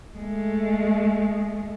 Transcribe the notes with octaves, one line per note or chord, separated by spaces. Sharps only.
G#3 A3